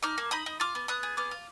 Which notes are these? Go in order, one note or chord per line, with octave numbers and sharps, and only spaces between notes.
D#4 D6 F6
A#3
D#4 B5 D#6
D#4
F4 D6 F6
B3
B3 D#6 F#6
G#4
B3 D6 F6
F4